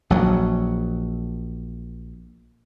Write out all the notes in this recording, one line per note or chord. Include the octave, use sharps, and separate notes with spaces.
A#1 F#3